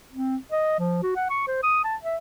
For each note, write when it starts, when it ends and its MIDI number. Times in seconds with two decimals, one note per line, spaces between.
0.13 0.37 60
0.52 0.79 75
0.79 1.02 53
1.03 1.12 66
1.16 1.27 78
1.30 1.46 85
1.48 1.59 72
1.63 1.81 87
1.84 1.96 81
2.03 2.17 76